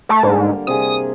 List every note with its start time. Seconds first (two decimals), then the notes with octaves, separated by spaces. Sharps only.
0.09 A3 A5
0.23 G#2 D3 G3 A#3
0.67 C3 G#4 D#6